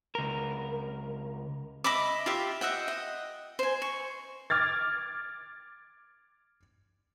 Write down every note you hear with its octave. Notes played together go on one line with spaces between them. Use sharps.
C#2 A#4
D#5 E5 B5 D6
F4 G4 E5
D#5 E5 F#5 G5
D#5
C5 G#5
C#6
D6 F6 G#6 A6